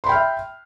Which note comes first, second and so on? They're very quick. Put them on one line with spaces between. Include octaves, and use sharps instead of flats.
C6 B5 G5 F6 E5